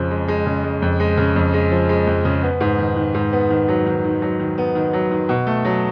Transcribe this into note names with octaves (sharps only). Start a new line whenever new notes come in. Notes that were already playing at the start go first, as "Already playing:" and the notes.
Already playing: F2 C#3 F3
G#3
G#3
C#3
G#3
F2
G#3
C#3
F2
G#3
F3
G#3
F2
C#3
B3
G#2
D#3
D#3
G#2
B3
D#3
F#3
D#3
D#3
F#3
D#3
B3
D#3
F#3
D#3
B2
A3
F#3